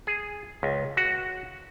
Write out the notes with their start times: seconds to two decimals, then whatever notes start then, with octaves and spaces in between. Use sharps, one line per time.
0.07 G#4
0.63 C#2
0.97 F#4